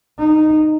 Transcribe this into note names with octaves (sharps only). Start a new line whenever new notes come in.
D#4